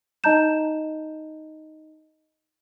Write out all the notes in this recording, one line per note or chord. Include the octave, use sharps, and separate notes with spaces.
D#4 D#5 A5 A#5 G6 E7